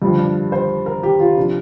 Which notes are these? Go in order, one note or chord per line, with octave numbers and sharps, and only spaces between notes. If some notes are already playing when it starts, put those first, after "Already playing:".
G2 D3 F3 G4
D4
C5
A#4
G4
F4
C3 F3 D4